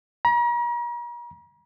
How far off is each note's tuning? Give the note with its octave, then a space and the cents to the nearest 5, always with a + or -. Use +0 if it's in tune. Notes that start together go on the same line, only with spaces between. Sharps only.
A#5 +40